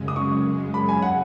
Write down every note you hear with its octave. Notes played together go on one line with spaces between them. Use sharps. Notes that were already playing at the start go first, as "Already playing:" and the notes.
Already playing: F#2 C#3 G#3
D#6
C#6
B5
G#5
F#5